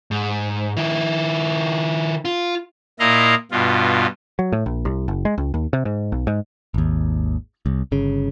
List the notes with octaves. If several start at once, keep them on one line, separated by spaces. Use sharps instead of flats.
G#2
D#3 E4
F4
A#2 E4 D#5 F5 A#5
G2 B2 F4
F#3
A2
A#1
C2
F#1
G#3
C#2
D#2
C3
G#2
B1
G#2
G#1 D#2
C2
G1 C#3